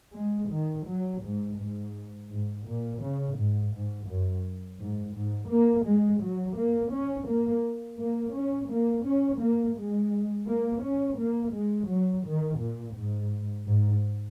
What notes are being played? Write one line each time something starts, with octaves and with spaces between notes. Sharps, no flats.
G#3
D#3
F#3
G#2
G#2
G#2
A#2
C#3
G#2
G#2
F#2
G#2
G#2
A#3
G#3
F#3
A#3
C#4
A#3
A#3
C#4
A#3
C#4
A#3
G#3
A#3
C#4
A#3
G#3
F#3
D#3
A#2
G#2
G#2